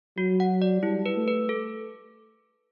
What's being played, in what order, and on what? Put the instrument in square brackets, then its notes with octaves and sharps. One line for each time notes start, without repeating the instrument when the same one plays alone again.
[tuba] F#3 [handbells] F#4
[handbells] F#5
D5
[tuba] G3 [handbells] E4
[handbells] B4
[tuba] A3
[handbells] B4
A4